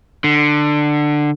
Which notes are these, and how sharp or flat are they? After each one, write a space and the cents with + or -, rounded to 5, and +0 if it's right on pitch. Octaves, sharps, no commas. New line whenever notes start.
D3 +15